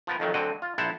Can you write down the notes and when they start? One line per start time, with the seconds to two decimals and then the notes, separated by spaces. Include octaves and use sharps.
0.07 F3 B3 A#4
0.20 F2 D#3 F#3 A3
0.34 D2 D3 F#3 C4 D#5 F#5
0.62 F4
0.78 A#1 E4 C5 F#5 A5 A#5